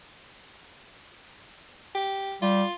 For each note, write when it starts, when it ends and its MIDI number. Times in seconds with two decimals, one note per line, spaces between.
1.95 2.36 67
2.42 2.63 55
2.42 2.73 65